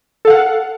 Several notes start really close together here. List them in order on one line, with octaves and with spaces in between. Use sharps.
A4 F5 F#5